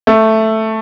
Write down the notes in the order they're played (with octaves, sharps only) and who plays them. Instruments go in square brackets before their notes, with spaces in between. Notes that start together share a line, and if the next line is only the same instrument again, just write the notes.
[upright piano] A3